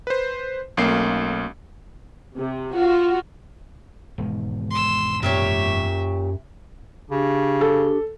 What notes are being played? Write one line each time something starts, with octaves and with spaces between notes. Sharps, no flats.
B4 C5
B1 A3 A#3 C#4 C7
C3
F4 F#4
E1 G#2 D#3
C6 E6
F#2 A#2 G4 C#5 E5
C#3 D4 G4
A4